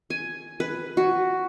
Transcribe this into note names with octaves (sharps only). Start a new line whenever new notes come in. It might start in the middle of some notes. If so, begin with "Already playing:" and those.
G#5
B4
F#4